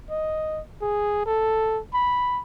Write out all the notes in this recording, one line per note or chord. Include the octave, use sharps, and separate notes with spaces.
D#5
G#4
A4
B5